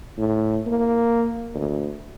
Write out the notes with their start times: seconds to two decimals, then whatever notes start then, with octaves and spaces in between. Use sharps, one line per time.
0.17 A2
0.67 A#3
1.55 D2